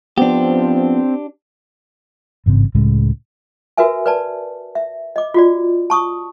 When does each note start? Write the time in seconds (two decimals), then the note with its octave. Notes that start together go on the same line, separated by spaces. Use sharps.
0.18 F3 B3 C4 D4 G4
2.46 A1 G#2 C#3 C4
2.75 C#2 A2 C#3 G#3
3.77 F#4 A#4 B4 E5 G#5
4.06 B4 D5 A5
4.75 E5
5.16 D#5 D6
5.34 F4 F#4 D5
5.90 A5 C#6 D#6